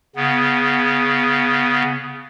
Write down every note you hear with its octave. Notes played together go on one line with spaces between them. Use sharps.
C#3 B3